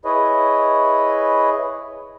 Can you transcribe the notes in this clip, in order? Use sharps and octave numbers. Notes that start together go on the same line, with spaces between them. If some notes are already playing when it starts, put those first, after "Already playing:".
E4 G#4 B4 C#5 D#5